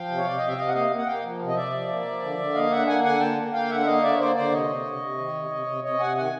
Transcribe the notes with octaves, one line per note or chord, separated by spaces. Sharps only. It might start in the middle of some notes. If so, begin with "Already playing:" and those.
Already playing: F3 F5 G5
C3
C#5
C3 D5
C3 D#5
E5
C3 D#5 F5
F#5
A#3 D#5 F5
A#3
F#5
A#3 F5 G5
F3
C3
D#5
C3 D5 E5
F3
A#3
F3
D3
D3
A#3 D#5 F5
D3 E5 F#5
A#3 F#5 G#5
D3 F#5 G#5
A#3 G5 A5
A#3
A#3 F5 G5
D3 E5 F#5
E5
A#3 D#5 F5
D3 D5 E5
C#5
A#3 C5 D5
D3 C5 D5
C3 C#5 D#5
C3
C3
C3
D#3
C3
C3
C3
C3 C#5 D#5
C3 F#5 G#5
D#3 F#5 G#5